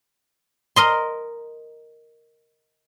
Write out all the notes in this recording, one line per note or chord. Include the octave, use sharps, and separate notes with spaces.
A#4 D#5 C6